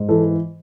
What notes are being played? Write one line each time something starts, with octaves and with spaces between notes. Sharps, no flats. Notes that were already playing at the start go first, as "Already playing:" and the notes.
Already playing: G#2
E3 A4